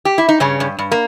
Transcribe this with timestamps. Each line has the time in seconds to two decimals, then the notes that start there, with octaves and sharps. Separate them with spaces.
0.05 G4
0.18 E4
0.29 D#4
0.40 G2 C#3 C#4
0.60 G2
0.79 G2
0.92 A#3